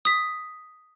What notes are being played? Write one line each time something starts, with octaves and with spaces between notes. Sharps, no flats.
D#6 B6